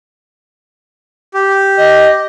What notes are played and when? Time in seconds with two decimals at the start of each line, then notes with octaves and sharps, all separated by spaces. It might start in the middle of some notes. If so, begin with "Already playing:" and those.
1.34 G4
1.78 D#5